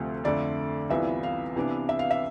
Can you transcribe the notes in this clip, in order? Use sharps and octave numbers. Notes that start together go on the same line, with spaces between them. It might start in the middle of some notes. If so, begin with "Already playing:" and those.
Already playing: D2 C3 F3 A3
F2 D3 A3 D5
C2 C3 E3 B3 F4 E5
F5
C3 E3 B3 D4
E5
F5
E5